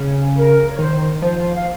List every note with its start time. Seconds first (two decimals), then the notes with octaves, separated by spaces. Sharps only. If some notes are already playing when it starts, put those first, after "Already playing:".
Already playing: C#3
0.36 A#4
0.72 C#5
0.79 D#3 C5
1.22 F3 C5
1.55 F5